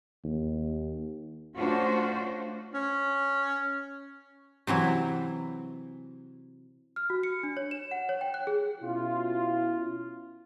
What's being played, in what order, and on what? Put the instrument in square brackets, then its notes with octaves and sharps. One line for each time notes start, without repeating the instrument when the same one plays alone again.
[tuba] D#2
[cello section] A3 C#4 D4 F4 F#4 C5
[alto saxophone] C#4
[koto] C3 E3 F#3 E4
[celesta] F6
F#4
C#7
D4
C#5
E7
F#5
C#5
G5
F#6
G#4
[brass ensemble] B2 C#4 E4 F4